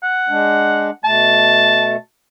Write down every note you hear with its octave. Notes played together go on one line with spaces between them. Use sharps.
F#5
G#3 D4
B2 A3 A5